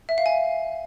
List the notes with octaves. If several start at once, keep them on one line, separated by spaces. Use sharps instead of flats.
E5
F5
G#5